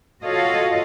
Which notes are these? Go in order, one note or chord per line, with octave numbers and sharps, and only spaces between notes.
F4 F#4 A4 C#5 D#5 F5